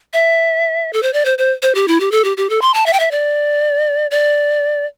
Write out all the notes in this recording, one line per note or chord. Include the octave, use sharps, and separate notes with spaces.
E5
A4
C5
D5
C5
C5
C5
G4
E4
G4
A4
G4
G4
A4
C6
A5
E5
G5
E5
D5
D5